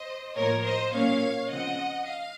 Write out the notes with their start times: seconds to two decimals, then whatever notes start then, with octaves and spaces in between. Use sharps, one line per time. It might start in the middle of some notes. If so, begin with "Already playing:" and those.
Already playing: C5 D#5
0.36 A2 F3 A#3 A#4 C#5
0.64 C5 D#5
0.93 A#2 F#3 A#3 C#4 C#5 F5
1.50 C#3 F3 C4 D#5 F#5
2.07 F5